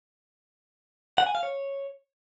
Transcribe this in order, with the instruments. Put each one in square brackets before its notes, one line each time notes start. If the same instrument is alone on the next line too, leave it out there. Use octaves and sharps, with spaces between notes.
[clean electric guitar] F#5
G#5
F5
C#5